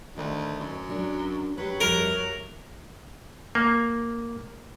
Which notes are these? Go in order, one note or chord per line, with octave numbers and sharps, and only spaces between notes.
D2 D#3
F#2
F#3 D4 A#4
F#3 G4 B4
F2 G3 A#4 E5
A#3